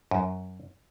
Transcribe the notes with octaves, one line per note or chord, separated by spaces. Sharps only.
F#2